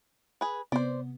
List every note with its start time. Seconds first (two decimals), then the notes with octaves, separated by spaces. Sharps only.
0.41 G#4 B4
0.72 C3 B3 C5 D5